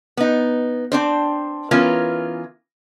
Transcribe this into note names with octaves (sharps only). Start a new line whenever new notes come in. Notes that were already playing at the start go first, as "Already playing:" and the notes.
B3 D#4
C4 D4 C5
E3 B3 C#4 F4 A#4